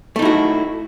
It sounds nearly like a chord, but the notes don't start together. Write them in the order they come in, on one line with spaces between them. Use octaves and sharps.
A3 D#4 E4 F#4